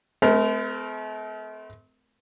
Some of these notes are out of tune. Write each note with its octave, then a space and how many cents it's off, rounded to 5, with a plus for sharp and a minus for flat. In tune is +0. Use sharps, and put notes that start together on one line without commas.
A3 -40 C4 -40 A#4 +0